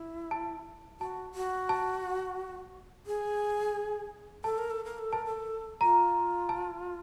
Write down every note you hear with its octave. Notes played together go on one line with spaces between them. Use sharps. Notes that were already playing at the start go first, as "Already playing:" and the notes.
Already playing: E4
A5
F#4 A5
F#4
A5
G#4
A4 A5
A#4
A4
A#4
A4
A#4 A5
A4
F4 A#5
A5